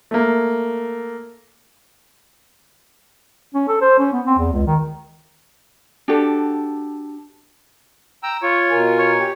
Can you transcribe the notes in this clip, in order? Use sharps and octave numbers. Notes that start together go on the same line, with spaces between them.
A3 A#3
C#4
A4
C5
C#4
B3
C4
E2
C#2
D#3
D4 F#4 G4 A4
G5 A#5 E6
F4 C#5
B2 A#4 G#5
C#5
G4